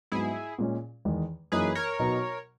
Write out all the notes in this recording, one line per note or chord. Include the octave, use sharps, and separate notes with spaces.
G#2 F#3 B3 E4 G#4
A#2 G#3 C#4
E2 D#3 G#3
F#2 E3 A#3 D#4 G#4 B4
A#4 C#5
B2 F#3 B3 D#4